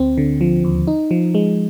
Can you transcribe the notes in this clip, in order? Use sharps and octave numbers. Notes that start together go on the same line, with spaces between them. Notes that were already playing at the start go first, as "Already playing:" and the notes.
Already playing: D2 C4
D3
F3
D#2
D#4
F3
G#3